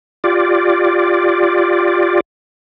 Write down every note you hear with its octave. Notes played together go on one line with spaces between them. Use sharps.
F4 G4 D5